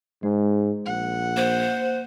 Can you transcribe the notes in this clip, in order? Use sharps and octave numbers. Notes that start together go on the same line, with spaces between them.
G#2 G#3
A#1 F#5
A#3 C5